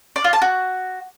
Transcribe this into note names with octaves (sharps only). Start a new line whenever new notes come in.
D5
F4
A5
F#4